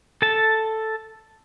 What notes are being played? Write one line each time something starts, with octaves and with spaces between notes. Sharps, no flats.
A4 A5